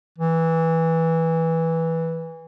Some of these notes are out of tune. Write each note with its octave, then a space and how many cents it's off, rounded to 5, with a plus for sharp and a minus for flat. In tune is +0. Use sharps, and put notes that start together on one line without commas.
E3 -10